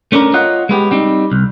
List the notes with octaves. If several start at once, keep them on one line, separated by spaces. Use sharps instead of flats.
A3 C#4 D4 G#4 A#4
F4 C#5 D#5 F#5
G#3 B3 G4
G3 C4 D#4
C2